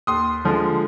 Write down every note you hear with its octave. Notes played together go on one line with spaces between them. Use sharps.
D#2 C6 D#6
D3 F3 G#3